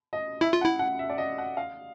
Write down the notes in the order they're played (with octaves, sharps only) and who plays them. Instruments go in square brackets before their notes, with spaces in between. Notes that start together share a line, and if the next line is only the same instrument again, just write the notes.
[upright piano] D#5
[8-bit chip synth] E4 [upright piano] E5
[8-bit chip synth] F4
[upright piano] F#5
[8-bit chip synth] E4
[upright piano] F#5
E5
D5
D#5
F#5
F5